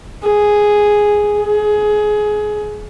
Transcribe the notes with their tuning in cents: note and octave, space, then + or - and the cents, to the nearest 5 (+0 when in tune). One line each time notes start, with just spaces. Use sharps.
G#4 +0
G#4 +20